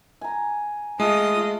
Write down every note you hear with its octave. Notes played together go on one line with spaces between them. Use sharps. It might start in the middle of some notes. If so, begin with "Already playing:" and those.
G#5 A#5
G#3 A3 F4 A4 D#5 D#6